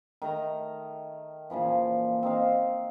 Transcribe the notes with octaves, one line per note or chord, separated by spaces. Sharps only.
D#3 A3 A#5
A#2 C#3 E3 F3
C4 D#4 F5